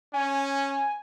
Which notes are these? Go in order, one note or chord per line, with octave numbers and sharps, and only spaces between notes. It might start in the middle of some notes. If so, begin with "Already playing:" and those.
C#4 G#5